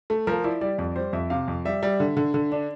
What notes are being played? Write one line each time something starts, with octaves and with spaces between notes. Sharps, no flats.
A3
F3 A#4
E4 D5
G3 D5
F2 D5
G3 C5
F2 E5
C3 F5
F2
G3 E5
G3
D3
D3
D3
D4